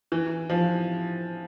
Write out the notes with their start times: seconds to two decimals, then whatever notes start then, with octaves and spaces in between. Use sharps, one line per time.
0.12 E3
0.50 F3